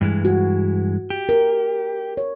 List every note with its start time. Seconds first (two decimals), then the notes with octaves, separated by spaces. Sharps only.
0.01 G2 E3 G#3
0.25 F#4
1.10 G4
1.29 A#4
2.17 C#5